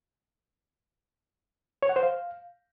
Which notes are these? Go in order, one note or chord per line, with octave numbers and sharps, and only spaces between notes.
C#5
F#5
C5
F5